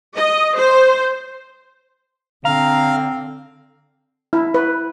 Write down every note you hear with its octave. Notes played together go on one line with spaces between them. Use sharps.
D#5
C5
D3 C4 F5 A#5
E4
B4